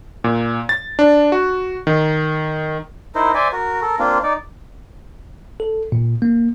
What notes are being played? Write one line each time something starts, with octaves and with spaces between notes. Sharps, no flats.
A#2
A6
D4
F#4
D#3
D#4 E4 A#4 C5
C5 D5 E5 G#5
F#4 A#4
A4 A#4
A#3 C4 D4 F4
D#4 D5
A4
A#2
A#3